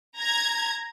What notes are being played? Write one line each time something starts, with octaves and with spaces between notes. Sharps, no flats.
A#5 G#6